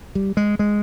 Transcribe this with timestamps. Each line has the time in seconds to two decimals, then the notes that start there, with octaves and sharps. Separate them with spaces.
0.15 G3
0.37 G#3
0.59 G#3